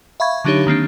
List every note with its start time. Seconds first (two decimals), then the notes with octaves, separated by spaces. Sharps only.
0.20 E5 F5 B5 C#6 G#6
0.45 D3 F#3 D4 D#4 G4 C#5
0.67 D#3 A#3 C4 D4